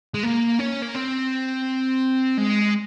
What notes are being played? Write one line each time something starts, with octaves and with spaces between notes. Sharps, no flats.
G#3
A#3
C#4
A#3
C4
G#3